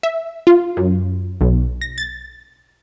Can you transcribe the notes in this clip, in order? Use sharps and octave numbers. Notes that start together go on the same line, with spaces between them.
E5
F4
F#2
B1
A#6
A6